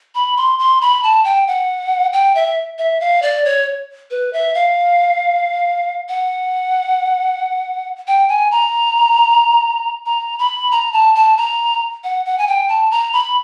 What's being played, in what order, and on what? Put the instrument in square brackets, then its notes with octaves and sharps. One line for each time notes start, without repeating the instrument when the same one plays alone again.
[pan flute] B5
C6
C6
B5
A5
G5
F#5
G5
E5
E5
F5
D5
C#5
B4
E5
F5
F#5
G5
G#5
A#5
A#5
B5
A#5
A5
A5
A#5
F#5
F#5
G#5
G5
A5
A#5
B5